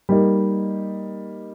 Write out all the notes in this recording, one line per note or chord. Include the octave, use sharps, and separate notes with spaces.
G3 A#3 D#4